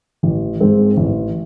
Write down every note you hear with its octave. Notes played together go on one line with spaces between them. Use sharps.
A1
G#2 G#3 C4
A1